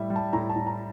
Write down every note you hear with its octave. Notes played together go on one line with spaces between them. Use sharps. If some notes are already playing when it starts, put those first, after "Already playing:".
Already playing: A2 G3 E5
G3
A5
A2 A#5
A5
A2
A#5